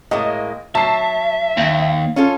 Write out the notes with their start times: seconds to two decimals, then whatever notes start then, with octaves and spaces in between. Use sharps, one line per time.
0.11 A2 G#3 A#3 D#5
0.75 F#3 E5 A5 C7
1.57 D#2
2.16 C#4 F4 A4